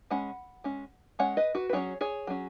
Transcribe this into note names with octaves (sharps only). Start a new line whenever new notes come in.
G#3 C#4 F#5 B5
G#3 C#4
G#3 C#4 C#5 F#5
B4 D#5
F#4 B4
B4
F#3 C#4 G#4 C#5
G#4 C#5
F#3 C#4